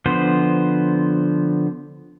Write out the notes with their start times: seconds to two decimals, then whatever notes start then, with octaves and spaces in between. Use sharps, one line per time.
0.06 D3 F3 B3 C5 C6